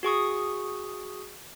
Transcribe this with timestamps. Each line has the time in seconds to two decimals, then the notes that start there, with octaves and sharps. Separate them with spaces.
0.03 F#4 G#4 C#6 D#6